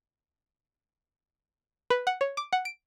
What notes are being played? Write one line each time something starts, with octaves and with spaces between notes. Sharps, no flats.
B4
F#5
C#5
D6
F#5
D7